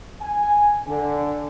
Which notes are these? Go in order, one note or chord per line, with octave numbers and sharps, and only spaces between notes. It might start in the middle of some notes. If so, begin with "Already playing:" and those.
G#5
D3